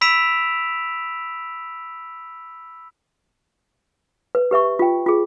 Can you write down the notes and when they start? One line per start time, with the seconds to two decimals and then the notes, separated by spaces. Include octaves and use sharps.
0.01 B5 E6 B6 D7 E7 F7
4.35 B4
4.51 G4 B4 E5 C#6
4.79 F4 G5
5.06 F4 G#4